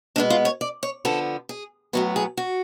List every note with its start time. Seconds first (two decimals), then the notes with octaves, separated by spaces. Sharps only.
0.16 B2 G#3 B3 D4
0.30 F4
0.45 C#5
0.61 D5
0.83 C#5
1.05 D3 F3 B3 A4
1.49 G#4
1.93 A2 F#3 B3 F#4
2.16 G#4
2.37 F#4